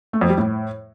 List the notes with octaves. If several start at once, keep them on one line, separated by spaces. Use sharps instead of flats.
A3
F2
G3
A2